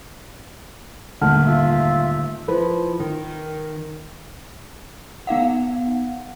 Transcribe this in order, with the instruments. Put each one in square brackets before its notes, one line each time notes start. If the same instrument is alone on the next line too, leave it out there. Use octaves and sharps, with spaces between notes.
[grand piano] D#1 G#2 [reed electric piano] D3 A3 A#3 [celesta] F#5 A5 F6
[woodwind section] F4 E5
[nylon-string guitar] F3 E4 B4
D#3
[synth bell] B3 D#4 F5 F#5